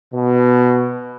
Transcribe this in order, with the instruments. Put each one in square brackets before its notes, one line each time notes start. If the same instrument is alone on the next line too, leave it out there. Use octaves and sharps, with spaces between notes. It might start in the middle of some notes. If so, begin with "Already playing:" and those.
[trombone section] B2